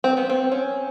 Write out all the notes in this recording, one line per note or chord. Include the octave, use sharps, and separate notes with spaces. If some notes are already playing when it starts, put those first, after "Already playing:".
C4
B3
C4
C#4